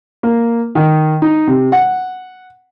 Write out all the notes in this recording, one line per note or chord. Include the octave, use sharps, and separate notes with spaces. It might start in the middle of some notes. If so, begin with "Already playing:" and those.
A#3
D#3
D#4
C3
F#5